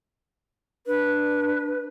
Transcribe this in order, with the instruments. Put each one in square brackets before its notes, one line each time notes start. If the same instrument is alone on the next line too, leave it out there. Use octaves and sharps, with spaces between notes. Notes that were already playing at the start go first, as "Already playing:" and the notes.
[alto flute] D4 [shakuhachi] B4